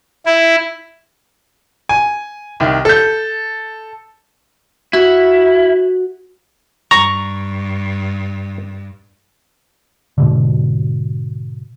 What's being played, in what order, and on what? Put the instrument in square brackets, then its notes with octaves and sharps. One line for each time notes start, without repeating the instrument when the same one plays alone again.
[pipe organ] E4
[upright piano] G#5
C2 D#3
A4 G6
[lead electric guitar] E4 [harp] F#4
[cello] G2 [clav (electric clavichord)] A#5 [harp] C#6
[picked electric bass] G#2 B2 D3